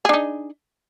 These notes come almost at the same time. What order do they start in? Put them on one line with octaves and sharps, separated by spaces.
G#4 D4 D#4